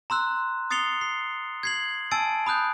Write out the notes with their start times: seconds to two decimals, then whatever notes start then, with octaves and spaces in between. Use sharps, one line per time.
0.10 A#5 C6 E6 F#6
0.70 D#6 A6 C7 C#7 F7 G7
1.01 C7
1.63 G#6 C7 F#7
2.11 G#5 A5 E6 A6 D7
2.46 B5 D#6 F#6 G6